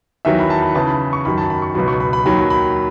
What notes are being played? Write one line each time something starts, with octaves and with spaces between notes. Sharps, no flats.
E2 D#3 F#3 E5
B5
A5
B5
E2 C#3 E3 A5
B5
C#6
F#2 D#3 F#3 B5
A5
B5
C#6
C#2 B2 F#3 B5
C#6
B5
B5
D#2 D#3 F#3 B5
B5